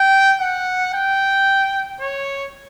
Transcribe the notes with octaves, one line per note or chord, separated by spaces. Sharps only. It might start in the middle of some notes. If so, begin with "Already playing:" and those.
Already playing: G5
F#5
G5
C#5